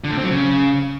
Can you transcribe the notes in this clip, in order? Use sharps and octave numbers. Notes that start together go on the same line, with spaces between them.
D3
A2
C4
F#3
C#3